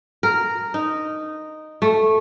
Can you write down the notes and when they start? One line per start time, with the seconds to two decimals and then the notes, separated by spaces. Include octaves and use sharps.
0.23 A#4
0.74 D#4
1.82 A3